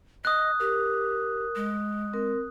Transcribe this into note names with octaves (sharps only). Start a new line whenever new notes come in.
D#5 D#6 F#6
G4 A#4
G#3
C4 A#4